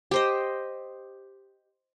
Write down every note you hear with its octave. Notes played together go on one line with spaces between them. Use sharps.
G4 C5 D#5